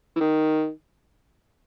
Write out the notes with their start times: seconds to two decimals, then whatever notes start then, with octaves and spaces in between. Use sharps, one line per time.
0.16 E3
0.20 D#3